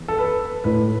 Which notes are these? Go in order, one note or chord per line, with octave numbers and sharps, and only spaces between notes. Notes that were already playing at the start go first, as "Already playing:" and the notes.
Already playing: E2
A4
B4
A2 A3 E4 B4